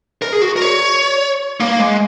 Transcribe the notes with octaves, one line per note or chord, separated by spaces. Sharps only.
A#4
G#4
F#4
A#4
C#5
A#3
G#3